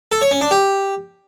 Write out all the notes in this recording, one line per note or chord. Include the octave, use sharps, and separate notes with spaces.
A4
C#5
C#4
D4
G4